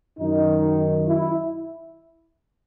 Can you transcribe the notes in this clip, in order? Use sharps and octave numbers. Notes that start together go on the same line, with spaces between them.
F#2 D#3 D#4
E4